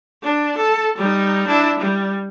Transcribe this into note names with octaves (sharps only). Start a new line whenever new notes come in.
D4
A4
G3 D#4
D4 E4
G3